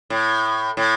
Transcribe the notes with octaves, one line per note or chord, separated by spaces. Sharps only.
A2
A2